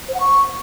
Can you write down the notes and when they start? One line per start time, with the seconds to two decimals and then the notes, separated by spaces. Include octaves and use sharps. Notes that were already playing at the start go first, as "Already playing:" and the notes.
0.08 C5
0.14 F#5
0.20 C#6